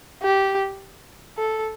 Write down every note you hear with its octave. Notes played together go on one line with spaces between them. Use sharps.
G4
A4